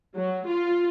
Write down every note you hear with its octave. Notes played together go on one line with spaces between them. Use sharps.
F#3
F4